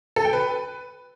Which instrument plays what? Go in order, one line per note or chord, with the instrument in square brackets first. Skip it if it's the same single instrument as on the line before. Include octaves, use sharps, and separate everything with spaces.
[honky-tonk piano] A4
G5
B4